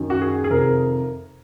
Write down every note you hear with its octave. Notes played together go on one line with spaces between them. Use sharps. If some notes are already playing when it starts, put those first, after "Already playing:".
Already playing: F#2 D#3
F#4
G#4
G#4
F2 C3 D#3 A#4